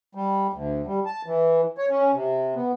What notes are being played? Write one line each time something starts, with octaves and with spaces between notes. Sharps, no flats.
G3
D2
G3
A5
E3
C#5
C#4
C3
B3